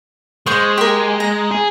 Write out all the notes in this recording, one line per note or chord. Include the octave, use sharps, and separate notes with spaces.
G#3 C5 C#6
G4 A#4
A#5
G#4